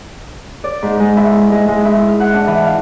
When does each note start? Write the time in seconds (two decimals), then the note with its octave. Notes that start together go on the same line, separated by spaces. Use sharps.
0.64 D5
0.83 G#2
1.00 G#3
1.17 E4
1.52 G#3
1.68 G#3
1.85 E4
2.08 F6
2.20 F#5
2.34 D4
2.47 E3
2.65 F5